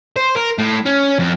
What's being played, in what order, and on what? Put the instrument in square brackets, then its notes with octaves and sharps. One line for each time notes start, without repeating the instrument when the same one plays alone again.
[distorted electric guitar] C5
A#4
A2
C#4
F2